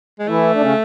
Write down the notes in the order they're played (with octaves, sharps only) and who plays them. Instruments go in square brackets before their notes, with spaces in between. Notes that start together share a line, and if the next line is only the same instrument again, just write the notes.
[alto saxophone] G#3
[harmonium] E3 E4 [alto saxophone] A3
[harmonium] D4
C#3 C#4